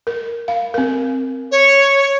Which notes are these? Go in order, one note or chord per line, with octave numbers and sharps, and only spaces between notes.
A#4
F5
C4 A#4
C#5